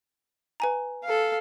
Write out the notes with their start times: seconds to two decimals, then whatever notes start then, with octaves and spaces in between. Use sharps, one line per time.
0.60 B4 G#5 A#5
1.04 A4 F5